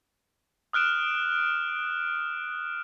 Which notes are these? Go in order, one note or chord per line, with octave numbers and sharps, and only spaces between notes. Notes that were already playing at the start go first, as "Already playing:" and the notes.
D#6 F6 F#6 D7 E7